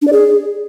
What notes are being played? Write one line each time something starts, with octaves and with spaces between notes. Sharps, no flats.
D4
D5
G#4